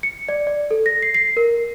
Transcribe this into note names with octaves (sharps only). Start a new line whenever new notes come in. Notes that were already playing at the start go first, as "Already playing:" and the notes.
C#7
D5
D5
A4
A#6
C7
C7
A#4